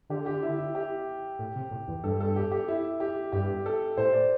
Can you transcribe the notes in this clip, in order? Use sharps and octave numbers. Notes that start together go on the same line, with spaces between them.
D3 G4
G4
E4
E4
G4
A2
C3
A2
E2
G2 A4
A4
G4
G4
E4
G4
G2 G4
A4
A2 C5
D5